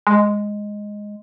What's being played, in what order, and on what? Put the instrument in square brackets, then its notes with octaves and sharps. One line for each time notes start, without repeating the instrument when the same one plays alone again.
[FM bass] G#3